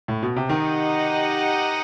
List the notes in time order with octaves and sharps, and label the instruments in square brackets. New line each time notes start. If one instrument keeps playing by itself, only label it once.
[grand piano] A2
B2
C3
[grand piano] D#3 [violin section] D#4 G4 D#5 F#5